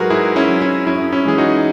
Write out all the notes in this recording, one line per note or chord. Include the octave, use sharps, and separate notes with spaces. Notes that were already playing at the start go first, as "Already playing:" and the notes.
Already playing: G#2 F#3 F#4 G#4 A#4 B4
G#2 E4 G#4
C#4 E4
F#3
C#4 E4
F#2 C#4 E4
C#4 E4
E3 G#3 G#4
D#4 F#4